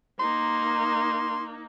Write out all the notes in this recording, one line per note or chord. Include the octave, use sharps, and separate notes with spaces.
A#3 D#4 C6